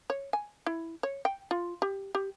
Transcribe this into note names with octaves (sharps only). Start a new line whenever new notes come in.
C#5
G#5
E4
C#5
G5
F4
G4
G4